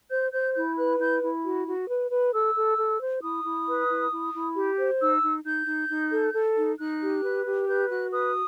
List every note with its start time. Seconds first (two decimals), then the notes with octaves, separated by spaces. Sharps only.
0.10 C5 G6
0.32 C5 G6
0.54 E4 G6
0.77 B4 F#6
0.99 E4 G6
1.22 E4
1.44 F#4
1.66 F#4
1.88 B4
2.10 B4
2.32 A4 E6
2.54 A4
2.77 A4
3.00 C5
3.21 E4 D#6
3.44 E4
3.67 B4
3.89 E4
4.11 E4
4.33 E4
4.56 G4
4.78 C5
5.00 D#4 E6
5.22 D#4
5.44 D#4 G6
5.67 D#4
5.89 D#4
6.11 A4
6.34 A4
6.56 D#4
6.78 D#4 F#6
7.01 G4
7.23 B4
7.45 G4
7.67 B4 G6
7.90 F#4 F#6
8.12 B4 D#6